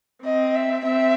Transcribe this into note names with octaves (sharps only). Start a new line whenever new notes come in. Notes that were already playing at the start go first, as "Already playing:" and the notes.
C4 D#5
E5
C4 E5